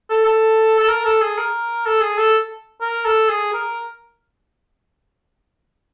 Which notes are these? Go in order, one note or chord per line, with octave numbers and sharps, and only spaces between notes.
A4
A4
A4
A#4
A4
G#4
A#4
A4
G#4
A4
A#4
A4
G#4
A#4